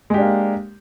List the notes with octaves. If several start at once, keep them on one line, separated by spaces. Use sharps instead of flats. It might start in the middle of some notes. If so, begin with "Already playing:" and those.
G#3 A#3 D4 G4